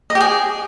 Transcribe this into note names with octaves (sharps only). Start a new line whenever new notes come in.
D#5
G4
G#4